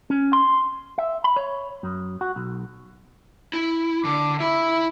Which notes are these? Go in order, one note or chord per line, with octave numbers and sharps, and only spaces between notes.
C#4
C6
E5
B5
C#5
F#2
F#4
B1
E4
D3 D6
E4 E5 B5